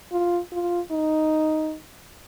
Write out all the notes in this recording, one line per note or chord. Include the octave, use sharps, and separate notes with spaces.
F4
F4
D#4